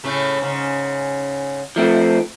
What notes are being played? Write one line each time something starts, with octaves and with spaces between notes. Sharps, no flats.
A2 C#3 A3
G#2 C#3
F3 A3 C4